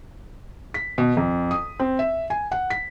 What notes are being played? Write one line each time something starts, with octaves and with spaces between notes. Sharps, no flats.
B6
B2
F2
D#6
C4
E5
G#5
F#5
B6